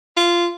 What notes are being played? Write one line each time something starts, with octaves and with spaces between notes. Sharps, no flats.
F4